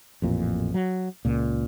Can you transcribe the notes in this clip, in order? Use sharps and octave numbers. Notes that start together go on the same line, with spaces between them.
A1 F2 A#2
F#3
C#2 A#2